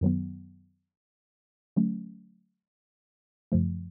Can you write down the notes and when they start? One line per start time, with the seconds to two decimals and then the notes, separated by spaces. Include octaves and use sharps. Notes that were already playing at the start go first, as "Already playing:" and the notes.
0.01 F#2 D#3 F#3 B3
1.76 D3 F#3 A3 C#4
3.52 F#2 C#3 F3 A3